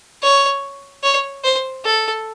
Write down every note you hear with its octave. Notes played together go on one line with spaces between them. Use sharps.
C#5
C#5
C5
A4